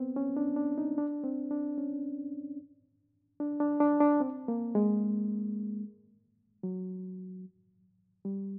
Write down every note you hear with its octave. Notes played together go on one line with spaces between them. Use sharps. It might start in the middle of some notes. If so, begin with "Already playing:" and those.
Already playing: B3 C4
C#4
D4
D4
D#4
D4
C4
D4
C#4
D4
D4
D4
D4
C4
A#3
G#3
F#3
G3